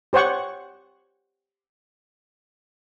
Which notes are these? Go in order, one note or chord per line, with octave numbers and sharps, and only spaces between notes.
G4 C5 C#5 F#5 C#6